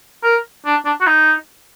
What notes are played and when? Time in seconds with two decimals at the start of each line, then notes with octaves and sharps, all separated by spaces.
0.24 A#4
0.66 D4
0.85 D4
1.01 F#4
1.07 D#4